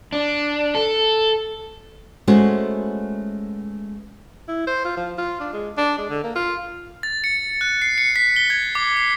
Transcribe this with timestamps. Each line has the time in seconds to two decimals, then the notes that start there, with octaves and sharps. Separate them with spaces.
0.13 D4
0.75 A4
2.28 G#3 A3 B3 C#4 F#4 C5
4.48 E4
4.67 C5
4.85 F4
4.97 F3
5.18 F4
5.40 D4
5.53 G#3
5.77 D4
5.98 G#3
6.10 D3
6.24 A#3
6.35 F4
7.03 A6
7.24 C#7
7.61 F#6
7.82 C7
7.98 C#7
8.16 B6
8.36 G7
8.50 G#6
8.75 D6
8.97 C7